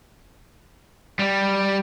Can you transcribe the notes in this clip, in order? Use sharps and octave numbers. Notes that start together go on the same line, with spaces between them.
G3